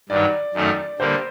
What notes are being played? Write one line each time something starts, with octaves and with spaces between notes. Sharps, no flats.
G2 D#3 F#3 D5
F#2 D#3 A3 D#4
D3 G3 A#3 C5